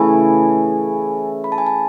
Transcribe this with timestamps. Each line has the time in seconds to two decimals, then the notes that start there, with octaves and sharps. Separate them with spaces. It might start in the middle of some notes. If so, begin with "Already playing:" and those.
Already playing: C#3 E3 A3 E4 G#5
1.44 B5
1.52 A5
1.58 G#5
1.66 A5